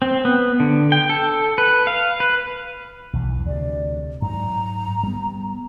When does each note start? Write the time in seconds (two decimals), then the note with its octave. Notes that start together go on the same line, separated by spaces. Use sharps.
0.02 C4
0.25 B3
0.60 D3
0.92 G5
1.09 A4
1.58 B4
1.87 F5
2.20 B4
3.13 B1 E2 E3
3.47 D2 C3 D5
4.22 G#2 F#3 A#5
5.03 G3 B3